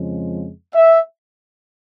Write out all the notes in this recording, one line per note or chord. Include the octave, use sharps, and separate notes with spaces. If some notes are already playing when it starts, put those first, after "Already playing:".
Already playing: F2 C#3 F3 G#3
E5